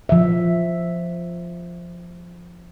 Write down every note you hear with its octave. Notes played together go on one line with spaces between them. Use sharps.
F3 E5